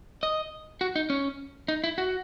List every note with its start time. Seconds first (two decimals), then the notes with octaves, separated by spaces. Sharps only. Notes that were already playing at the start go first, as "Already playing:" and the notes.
0.23 D#5
0.81 F#4
0.96 D#4
1.10 C#4
1.68 D#4
1.84 E4
1.98 F#4